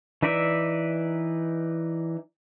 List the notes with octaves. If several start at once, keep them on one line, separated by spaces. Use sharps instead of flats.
E3 D#4 B4 D5 E5